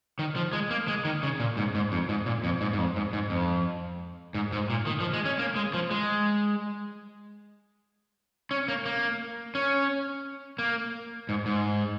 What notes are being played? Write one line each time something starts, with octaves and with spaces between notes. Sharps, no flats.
D#3
F3
G#3
A#3
G#3
D#3
C#3
A#2
G#2
G#2
F2
G#2
A#2
F2
G#2
G#2
F2
G#2
G#2
F2
G#2
G#2
A#2
D#3
F3
G#3
C#4
A#3
G#3
F3
G#3
C#4
A#3
A#3
C#4
A#3
G#2
G#2